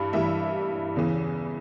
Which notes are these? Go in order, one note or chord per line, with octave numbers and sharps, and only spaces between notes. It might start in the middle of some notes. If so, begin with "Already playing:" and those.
Already playing: G2 E3 G3 B5
G2 E3 G3 E5
E2 C#3 E3